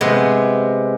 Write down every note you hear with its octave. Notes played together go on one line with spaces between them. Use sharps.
C3 G#3 B3